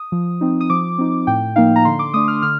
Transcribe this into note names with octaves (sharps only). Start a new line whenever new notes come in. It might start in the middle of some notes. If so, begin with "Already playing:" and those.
Already playing: D#6
F3
C4 D#4
D#6
F3 D6
C4 D#4
A2 G5
F3 A#3 D#4 F5
A#5
D3 C6
D6
A3 D4 D#6
F6
D3 F6